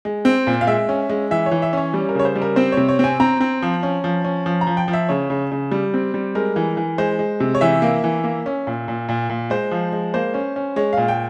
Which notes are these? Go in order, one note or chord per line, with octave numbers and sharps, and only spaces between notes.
G#3
C4
A#2
F5
G#3 E5
C#4
G#3
E3 E5
C#5
E3
E5
C#4 C#5
G3
A#4
C#3 C#5
C5
G3
A#4
C4 C5
C3 C#5
C#5
C4 G#5
C4 A#5
C4
F3
C#4
F3
C#4
F3
A#5
F3
G5
F3
E5
C#3 C#5
C#3
C#3
G3
C4
G3
G#3 A#4
E3
E3
G#3 C5
G#3
C3
C#5
E3 E5
A#3
E3
A#3
C#4
A#2
A#2
A#2
A#2
G#3 C5
F3
G#3
A#3 C5
C#4
C#4
G#3 C#5
A#2 F5
G5